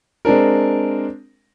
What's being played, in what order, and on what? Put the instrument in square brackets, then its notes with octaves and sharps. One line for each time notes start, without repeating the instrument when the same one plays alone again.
[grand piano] G#3 C4 D4 A#4